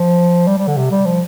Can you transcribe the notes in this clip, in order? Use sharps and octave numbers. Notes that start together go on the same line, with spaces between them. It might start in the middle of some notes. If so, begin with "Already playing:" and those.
Already playing: F3
G3
G3
D3
C3
G3
F3